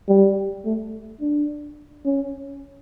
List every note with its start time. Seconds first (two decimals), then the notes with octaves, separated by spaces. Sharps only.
0.09 G3
0.65 A3
1.21 D4
2.05 C#4